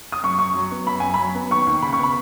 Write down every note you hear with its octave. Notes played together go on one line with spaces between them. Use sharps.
D#6
F#2 C#6
F#2 C#6
F#3
B3
F#2 B5
F#2 G#5
F#3 B5
B3
D#2 C#6
D#2
C#3 B5
C#6
B3 B5